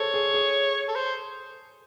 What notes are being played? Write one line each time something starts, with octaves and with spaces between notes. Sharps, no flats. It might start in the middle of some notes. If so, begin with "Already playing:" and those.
Already playing: G#4 A4 C5 C#5
G#4
G#4
A4
C5